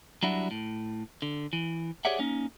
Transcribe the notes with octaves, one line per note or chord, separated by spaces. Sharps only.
F#3 G3 D4 E4 F#4
A2
D3
E3
G4 G#4 C#5 D5 E5 F#5
A#3 C#4 D#4